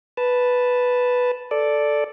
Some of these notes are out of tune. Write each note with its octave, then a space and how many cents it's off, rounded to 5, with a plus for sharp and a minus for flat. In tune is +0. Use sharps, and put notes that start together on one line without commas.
B4 +0 A5 +0
A4 +0 D5 +0